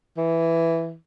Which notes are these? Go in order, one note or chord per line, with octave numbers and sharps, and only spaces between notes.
E3